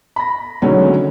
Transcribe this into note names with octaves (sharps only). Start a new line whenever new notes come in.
B5 A#6
D3 D#3 F#3 G#3 A3 C#4